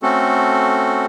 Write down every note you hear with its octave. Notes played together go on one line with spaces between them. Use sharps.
A3 C4 C#4 F#4 A4